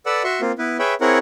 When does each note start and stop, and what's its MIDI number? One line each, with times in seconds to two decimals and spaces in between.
0.06 0.23 69
0.06 0.23 71
0.06 0.23 74
0.06 0.23 78
0.06 0.23 88
0.24 0.41 66
0.24 0.41 76
0.24 0.41 84
0.24 0.41 85
0.41 0.52 58
0.41 0.52 60
0.41 0.52 65
0.59 0.77 59
0.59 0.77 64
0.59 0.77 71
0.79 0.94 68
0.79 0.94 71
0.79 0.94 73
0.79 0.94 76
0.79 0.94 79
0.79 0.94 83
1.01 1.18 60
1.01 1.18 64
1.01 1.18 68
1.01 1.18 70
1.01 1.18 73
1.01 1.18 78